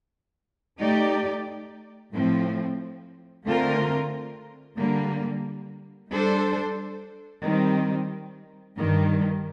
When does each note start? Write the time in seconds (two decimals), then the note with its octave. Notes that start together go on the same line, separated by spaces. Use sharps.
0.80 A3 D#4 G4 D5
2.12 A2 F3 C4
3.45 D3 A3 C4 F4 A#4
4.78 D3 G3 A#3
6.11 G3 D4 A4 C5
7.44 D#3 G3 C4
8.77 G2 D#3 G3